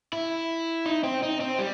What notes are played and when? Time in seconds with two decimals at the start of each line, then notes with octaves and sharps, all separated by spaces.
0.13 E4
0.86 D#4
1.04 C4
1.23 D#4
1.40 C4
1.59 G3